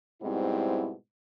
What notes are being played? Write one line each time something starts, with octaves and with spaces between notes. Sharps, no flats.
G#2 B2 G3 C4 E4